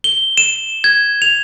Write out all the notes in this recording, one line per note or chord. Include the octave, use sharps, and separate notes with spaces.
G7
E7
G#6
F7